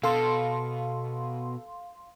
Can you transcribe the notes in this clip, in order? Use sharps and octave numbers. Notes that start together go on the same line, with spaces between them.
B2 A4 F5 C6